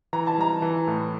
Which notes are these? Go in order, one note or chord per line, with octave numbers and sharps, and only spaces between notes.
E3 A#5
A5
G3 A#5
E3
A2